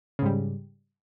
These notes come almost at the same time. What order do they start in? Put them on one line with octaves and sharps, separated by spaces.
C#3 G#2 G3